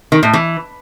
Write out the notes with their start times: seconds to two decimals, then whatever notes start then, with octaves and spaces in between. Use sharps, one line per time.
0.12 D#3
0.23 A2
0.33 E3